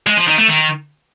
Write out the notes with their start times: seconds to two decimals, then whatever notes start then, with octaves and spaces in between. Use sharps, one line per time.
0.07 G#3
0.17 F3
0.27 D#3
0.38 A3
0.48 D#3